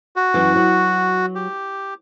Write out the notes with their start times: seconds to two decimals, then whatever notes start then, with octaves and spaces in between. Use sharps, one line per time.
0.16 F#4
0.34 F#2 E3
0.56 F#3
1.35 G4